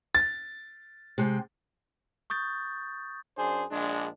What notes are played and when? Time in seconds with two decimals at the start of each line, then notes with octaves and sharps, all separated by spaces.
0.15 A6
1.18 C3 G#3 G5
2.30 C#6 D#6 G6 A6
3.38 F#2 D4 G#4 C5
3.71 A#1 G#3 D4